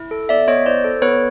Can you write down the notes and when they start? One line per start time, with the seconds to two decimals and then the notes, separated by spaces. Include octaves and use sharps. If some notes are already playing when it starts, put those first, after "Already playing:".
Already playing: E4
0.11 A4
0.29 B3 D5 E5
0.48 B3 C#5 D#5
0.66 E4 C5 D5
0.84 A4
1.02 B3 B4 C#5